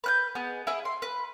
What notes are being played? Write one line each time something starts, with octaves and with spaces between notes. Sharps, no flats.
B4 F#6 G6
B3 G#4 D#5
E4 G#4 F#5
C6
B4